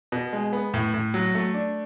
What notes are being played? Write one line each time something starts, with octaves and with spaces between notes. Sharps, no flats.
B2
G#3
B3
A2
A2
F#3
A3
D4